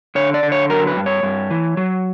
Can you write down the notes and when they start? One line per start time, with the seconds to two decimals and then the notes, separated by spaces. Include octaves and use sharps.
0.15 D3 C#5
0.34 D5
0.43 D3
0.52 C#5
0.70 F#3 A#4
0.87 B4
0.97 G2
1.06 C#5
1.23 G2
1.50 E3
1.77 F#3